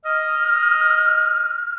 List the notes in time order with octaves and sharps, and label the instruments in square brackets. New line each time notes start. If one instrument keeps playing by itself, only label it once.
[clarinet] D#5 [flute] F6